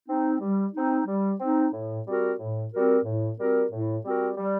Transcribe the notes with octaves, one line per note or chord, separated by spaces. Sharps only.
C4 D#4
G3
C4 D#4
G3
C4 D#4
A2
G3 C4 F#4 A#4
A2
G3 C4 F#4 A#4
A2
G3 C4 F#4 A#4
A2
G3 C4 F#4 A#4
G3